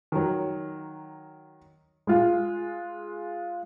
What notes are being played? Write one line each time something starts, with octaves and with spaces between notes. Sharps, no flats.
D#3 F#3
G#3 F4